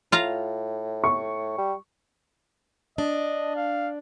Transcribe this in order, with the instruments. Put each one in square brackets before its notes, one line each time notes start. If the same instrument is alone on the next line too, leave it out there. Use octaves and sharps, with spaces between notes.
[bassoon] A2 [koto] F4 F5 A#5
[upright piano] C#6
[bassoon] G3
[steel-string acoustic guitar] D4 [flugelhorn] D#5
[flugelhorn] F5